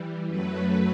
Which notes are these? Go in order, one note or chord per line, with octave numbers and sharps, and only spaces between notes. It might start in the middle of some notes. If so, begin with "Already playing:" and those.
Already playing: E3 G3
F#2 F#3 A3 B4